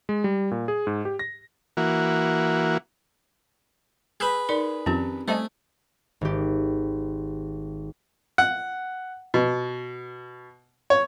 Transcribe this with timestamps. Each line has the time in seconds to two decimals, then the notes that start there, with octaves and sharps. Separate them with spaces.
0.09 G#3
0.24 G3
0.51 A#2
0.68 G#4
0.87 G#2
1.05 G4
1.19 A#6
1.77 E3 A#3 F#4
4.20 G#4 B4 B5 E6 G6
4.49 D#4 A#4 D5
4.86 F2 D#3 F3 C4 C#4 G4
5.28 G3 A3 C5 D#5 E5 G#5 A5
6.21 G#1 G4
8.38 F#5
9.34 B2
10.90 C#5